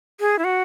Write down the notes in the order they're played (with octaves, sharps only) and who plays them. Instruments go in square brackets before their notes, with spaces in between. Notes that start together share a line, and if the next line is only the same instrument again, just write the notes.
[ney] G#4
E4
F#4